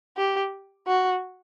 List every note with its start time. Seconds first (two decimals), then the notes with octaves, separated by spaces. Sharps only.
0.17 G4
0.87 F#4